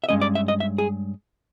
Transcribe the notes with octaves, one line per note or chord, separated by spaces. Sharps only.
E5
G2 D#3 G#3 C#4 D#5
D5
E5
D#5
E5
G#4